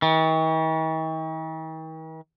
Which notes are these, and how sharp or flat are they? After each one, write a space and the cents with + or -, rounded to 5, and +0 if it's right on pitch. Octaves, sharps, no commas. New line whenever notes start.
D#3 +45